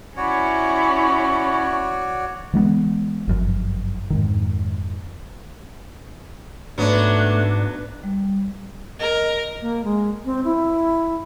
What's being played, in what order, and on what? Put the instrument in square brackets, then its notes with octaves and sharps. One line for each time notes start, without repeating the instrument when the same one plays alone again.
[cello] C#4 E4 [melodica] F#4 C#5 D5 [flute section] B5 C#6
[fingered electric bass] E3 G#3 A3 B3
G1 F#2 F3
F2 G#2 D#3
[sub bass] G#2 [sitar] F#3 B3 [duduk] A3 [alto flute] D4
[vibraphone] G3
[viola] A#4 [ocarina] D#5
[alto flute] A#3
G#3
C4
E4